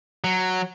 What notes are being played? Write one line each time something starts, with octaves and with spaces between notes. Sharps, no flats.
F#3